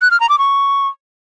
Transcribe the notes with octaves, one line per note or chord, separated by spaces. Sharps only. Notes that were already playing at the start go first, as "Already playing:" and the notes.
F#6
F6
A#5
D6
C#6